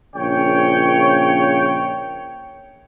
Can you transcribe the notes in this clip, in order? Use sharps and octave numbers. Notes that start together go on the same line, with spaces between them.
A#1 C#3 C#5 G5